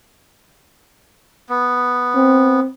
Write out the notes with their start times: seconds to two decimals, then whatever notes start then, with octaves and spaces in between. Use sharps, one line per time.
1.49 B3
2.15 C4